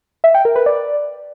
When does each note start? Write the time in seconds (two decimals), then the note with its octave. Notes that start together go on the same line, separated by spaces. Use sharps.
0.24 E5
0.34 G5
0.45 A#4
0.56 B4
0.66 D5